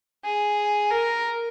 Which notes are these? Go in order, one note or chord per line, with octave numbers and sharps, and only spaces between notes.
G#4
A#4